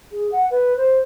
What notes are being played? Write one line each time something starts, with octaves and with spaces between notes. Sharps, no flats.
G#4
F#5
B4
C5